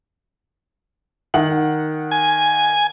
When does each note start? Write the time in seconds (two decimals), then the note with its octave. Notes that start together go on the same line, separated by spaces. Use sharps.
1.34 D#3 F#5 F#7
2.11 G#5